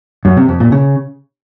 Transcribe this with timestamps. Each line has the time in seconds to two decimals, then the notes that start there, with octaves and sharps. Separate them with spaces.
0.25 F#2
0.37 C3
0.48 F2
0.60 A#2
0.72 C#3